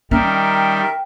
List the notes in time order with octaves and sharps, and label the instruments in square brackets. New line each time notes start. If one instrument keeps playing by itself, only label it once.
[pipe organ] D#3 G3 [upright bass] C#4 [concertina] A#4 E5 [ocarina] G5